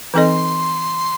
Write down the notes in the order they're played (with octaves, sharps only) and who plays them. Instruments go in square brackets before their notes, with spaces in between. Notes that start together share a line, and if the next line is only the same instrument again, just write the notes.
[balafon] E3 C4 D#4 A4 D#5 [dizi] C6 D6